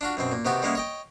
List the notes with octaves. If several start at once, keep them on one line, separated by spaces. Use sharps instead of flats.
D4 F4 F#4
F#2 B2 C4
A#2
C3 D#3 B3 F#4 G4
G3 G#3 A#3 B3 C#4 E4
C#5 D#5 G5